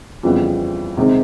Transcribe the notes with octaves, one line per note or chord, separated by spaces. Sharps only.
F2 C#3 E3 G3 B3
C3 D#3 G#3 C4